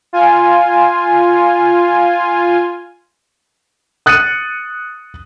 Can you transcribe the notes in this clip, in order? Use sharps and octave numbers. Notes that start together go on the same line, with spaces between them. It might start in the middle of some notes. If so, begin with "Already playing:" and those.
F4 G#5
D#6 F#6 A6 C#7 D#7